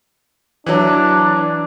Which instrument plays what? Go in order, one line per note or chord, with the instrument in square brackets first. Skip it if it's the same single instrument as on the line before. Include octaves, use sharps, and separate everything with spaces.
[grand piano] E3 F#3 [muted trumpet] D4